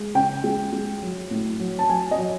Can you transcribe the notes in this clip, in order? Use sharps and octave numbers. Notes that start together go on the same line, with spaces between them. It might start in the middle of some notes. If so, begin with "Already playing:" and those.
Already playing: G#3
C#3 G5
G#3
G#3
F#3
A2
F#3
A5
F#3 G#5
D#5
F#3